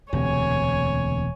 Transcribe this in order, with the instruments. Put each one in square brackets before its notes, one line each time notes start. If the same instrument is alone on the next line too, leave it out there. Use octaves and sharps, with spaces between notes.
[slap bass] E1 [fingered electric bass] D2 C3 [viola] C#5 G#5